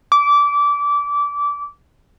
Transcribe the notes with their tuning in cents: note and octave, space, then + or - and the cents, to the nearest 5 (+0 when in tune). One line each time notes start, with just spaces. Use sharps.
D6 -20